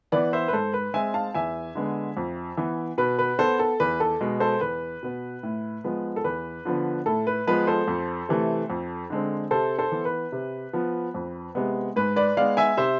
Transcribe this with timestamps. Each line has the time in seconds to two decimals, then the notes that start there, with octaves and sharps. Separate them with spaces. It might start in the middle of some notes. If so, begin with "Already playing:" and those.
0.12 E3 B3 B4 D5
0.33 C5 E5
0.48 B4
0.53 G#2 A4 C5
0.74 B4
0.94 G#3 C4 E5 G#5
1.14 F5 A5
1.35 E2 E5 G#5
1.75 D3 G#3 B3
2.17 F2
2.57 E3 B3
2.98 B2 B4
3.19 B4
3.39 B3 A4 C5
3.59 A4
3.80 E2 B4
4.00 A4
4.21 B2 G#3
4.40 A4 C5
4.61 E2 B4
5.03 B2 B3
5.43 A2
5.84 F3 G#3 B3
6.16 A4
6.24 E2 B4
6.65 D3 F3 B3
7.06 A2 A4
7.27 B4
7.47 F3 G#3 B3 B4
7.67 A4 C5
7.88 F2
8.29 C3 E3 A3
8.70 F2
9.10 D3 G#3 C4
9.51 C3 A4 C5
9.78 A4 C5
9.92 E3 B3
10.05 B4
10.32 C3
10.73 F3 B3
11.14 F2
11.55 C3 G#3 B3
11.96 G#2 B4
12.16 B4 D5
12.37 G#3 B3 D5 F5
12.57 E5 G#5
12.77 C3 C5 E5